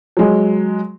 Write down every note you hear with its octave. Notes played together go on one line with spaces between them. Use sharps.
F#3 G#3